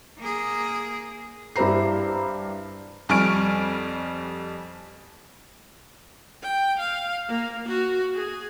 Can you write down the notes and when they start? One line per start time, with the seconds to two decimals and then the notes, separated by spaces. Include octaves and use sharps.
0.19 A#3 G#4
1.56 G2 E4 G4 C5 A#5 C7
3.09 F2 G3 G#5 C#6 F6 D7
6.42 G5
6.79 F5
7.28 A#3
7.68 F#4
8.15 G#4